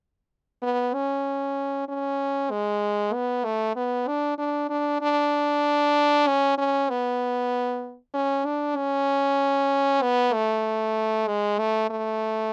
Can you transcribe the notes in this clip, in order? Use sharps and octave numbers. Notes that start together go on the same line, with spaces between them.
B3
C#4
C#4
G#3
B3
A3
B3
D4
D4
D4
D4
C#4
C#4
B3
C#4
D4
C#4
B3
A3
G#3
A3
A3